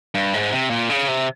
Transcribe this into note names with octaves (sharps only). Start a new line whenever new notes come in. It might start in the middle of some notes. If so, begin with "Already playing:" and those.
G2
G#2
C3
A#2
C#3
C3